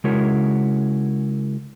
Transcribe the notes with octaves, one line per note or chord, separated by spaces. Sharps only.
C#3 G#3 E4 F#4 A#4 C#5